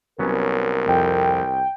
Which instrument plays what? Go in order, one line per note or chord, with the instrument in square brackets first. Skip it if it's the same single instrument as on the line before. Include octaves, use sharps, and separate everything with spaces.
[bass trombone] C2 [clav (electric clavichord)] F#3 B3 C#4 [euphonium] A#4
[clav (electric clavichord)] F2 [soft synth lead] G5